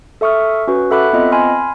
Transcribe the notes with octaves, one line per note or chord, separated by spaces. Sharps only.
A4 E5 C#6 D#6 F6
C#4 F#4 B4
A4 E5 F#5 B5 D6 F#6
B3 C4 F4 D#5
G#5 B5 C6 F6